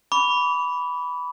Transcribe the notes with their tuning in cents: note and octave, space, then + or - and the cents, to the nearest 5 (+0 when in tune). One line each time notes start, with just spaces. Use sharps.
B5 +0 D6 -40